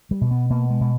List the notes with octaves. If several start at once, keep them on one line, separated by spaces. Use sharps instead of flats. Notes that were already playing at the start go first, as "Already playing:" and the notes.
G3
B2
B3
B2 A#3
G#3
B2